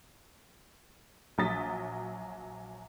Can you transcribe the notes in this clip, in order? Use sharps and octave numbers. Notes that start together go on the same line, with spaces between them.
A#1 F#3 D#6 A6 B6